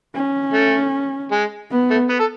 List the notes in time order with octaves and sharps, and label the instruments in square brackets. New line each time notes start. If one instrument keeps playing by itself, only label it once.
[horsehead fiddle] C#4
[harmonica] A3
G#3
[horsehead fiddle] B3
[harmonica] A3
B3
A4